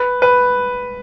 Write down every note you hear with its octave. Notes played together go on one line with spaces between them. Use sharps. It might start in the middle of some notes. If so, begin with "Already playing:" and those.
Already playing: B4
B4